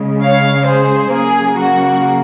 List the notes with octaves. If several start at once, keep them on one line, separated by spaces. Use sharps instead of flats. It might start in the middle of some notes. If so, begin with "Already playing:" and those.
Already playing: C#3 G#3
C#5 F5
G#4 C5
C#3 F#3 A#3 G#4
F#4